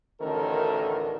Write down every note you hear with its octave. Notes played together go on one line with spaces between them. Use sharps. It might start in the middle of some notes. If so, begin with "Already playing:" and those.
A1 D2 D#3 C#4 A4 A#4